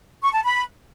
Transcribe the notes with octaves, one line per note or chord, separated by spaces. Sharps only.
C#6
A5
B5